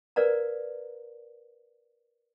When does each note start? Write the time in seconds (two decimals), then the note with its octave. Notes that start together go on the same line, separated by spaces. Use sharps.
0.16 A#4 B4 D5 F5 A#5